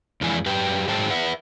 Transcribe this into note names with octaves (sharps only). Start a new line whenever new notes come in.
F2 E3 G#3 G#5
F#2 G4 B4 G5
G#2 F#3 G#4 C5 G5 A5
B4 E5 F#5